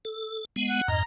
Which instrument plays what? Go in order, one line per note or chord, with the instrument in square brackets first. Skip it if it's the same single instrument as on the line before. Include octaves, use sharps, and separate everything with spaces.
[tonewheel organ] A4
G#3 B3
[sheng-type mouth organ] F#5
[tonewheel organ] F2 G#2 D#5 [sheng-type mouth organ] A#5